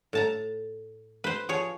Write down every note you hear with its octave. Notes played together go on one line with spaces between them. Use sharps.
A2 A5 A#5
B4 C5
F3 G#4 C#5